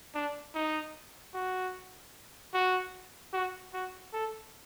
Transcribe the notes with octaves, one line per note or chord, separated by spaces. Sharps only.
D4
D#4
F#4
F#4
F#4
F#4
A4